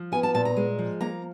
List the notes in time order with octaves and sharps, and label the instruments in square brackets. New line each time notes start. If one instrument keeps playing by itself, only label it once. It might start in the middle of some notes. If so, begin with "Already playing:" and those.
Already playing: [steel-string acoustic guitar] F3
B3 G#5
A5
A#2 A5
A#5
G#3
F3
A#3 A#5